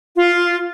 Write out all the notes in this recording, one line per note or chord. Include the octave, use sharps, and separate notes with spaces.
F4